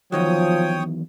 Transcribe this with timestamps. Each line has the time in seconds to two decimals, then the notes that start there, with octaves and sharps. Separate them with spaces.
0.12 E2 D#3 F3 F#3 C#5 G5 D#6